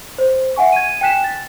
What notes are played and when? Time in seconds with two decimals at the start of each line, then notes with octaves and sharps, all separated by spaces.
0.18 C5
0.56 E5 F#5 G#5 C#6
0.72 G#6 D#7
1.01 G5 G#5 F#6 B6 E7
1.24 A6